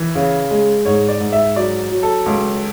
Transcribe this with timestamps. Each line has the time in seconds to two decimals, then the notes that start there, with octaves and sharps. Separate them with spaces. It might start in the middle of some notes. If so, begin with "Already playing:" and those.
Already playing: E3
0.15 C#3
0.51 G#3
0.85 G#2 C#5
1.08 D5
1.20 G#2
1.32 E5
1.56 F#3 D5
1.91 F#3
2.03 A4
2.26 C#2